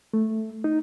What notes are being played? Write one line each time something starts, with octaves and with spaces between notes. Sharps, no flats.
A3
D#4